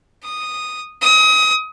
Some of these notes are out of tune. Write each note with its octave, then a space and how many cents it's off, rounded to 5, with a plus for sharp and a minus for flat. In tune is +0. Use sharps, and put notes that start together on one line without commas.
D#6 -5
D#6 +30